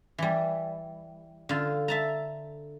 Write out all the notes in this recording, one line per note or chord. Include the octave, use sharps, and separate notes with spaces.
E3 G3
D3 F4
E5 A5 A#5